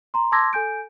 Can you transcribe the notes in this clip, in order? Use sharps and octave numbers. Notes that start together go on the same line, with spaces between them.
A#5 C6
A5 C6 D6 E6 G#6 A#6
A4 G#5 G6 D7